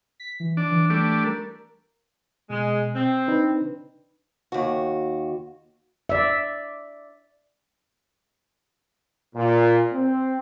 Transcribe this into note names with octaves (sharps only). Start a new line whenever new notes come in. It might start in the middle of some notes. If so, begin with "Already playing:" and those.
B6
E3
D4
E3
G3 A3 D4
A#4
B2 G#3
C4
D4 D#4 B4
D#2 F#4
D5 E5
A#2
C4